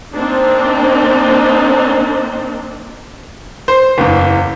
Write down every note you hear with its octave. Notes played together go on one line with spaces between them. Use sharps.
A#3 C4 D4 D#4
C5
F#1 E2